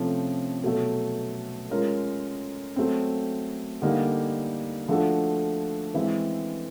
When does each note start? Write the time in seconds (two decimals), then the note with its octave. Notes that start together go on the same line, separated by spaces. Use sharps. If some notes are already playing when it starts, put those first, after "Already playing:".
Already playing: C3 F3 A3 C#4
0.64 B2 F#3 A3
1.70 G#3 C#4 F4 A#4
2.76 F#3 A3 C4
3.82 D3 G3 A#3 D#4
4.88 F3 A3 D4 F#4 A4
5.94 E3 G#3 C4 E4